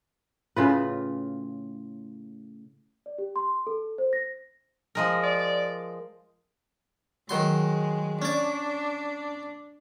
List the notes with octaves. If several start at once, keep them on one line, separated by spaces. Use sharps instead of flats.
A2 C#3 F4 B4
D5
G4
C6
A4
C5
A#6
F3 G#3 A#4
D5
D#3 F#3 G#3 C6
C#4 D4 D5